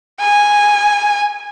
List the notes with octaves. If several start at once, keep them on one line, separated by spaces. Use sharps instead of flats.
G#5